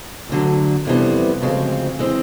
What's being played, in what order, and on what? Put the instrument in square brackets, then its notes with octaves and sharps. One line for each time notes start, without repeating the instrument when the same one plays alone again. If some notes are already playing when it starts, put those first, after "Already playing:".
[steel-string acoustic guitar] D2 D3 F#3
F2 C3 E3 G3 B3
D2 C#3 F3 G#3 C4
E3 G#3 C4